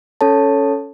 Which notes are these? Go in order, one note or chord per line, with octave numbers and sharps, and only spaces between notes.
C#4 A4 C#5 A5